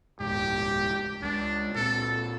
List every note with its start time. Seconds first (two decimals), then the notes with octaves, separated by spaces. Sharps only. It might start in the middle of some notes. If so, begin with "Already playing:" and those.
0.20 D#1 C#2 G#2 G4
1.22 C#2 G#3 D4
1.75 A#2 C4 A4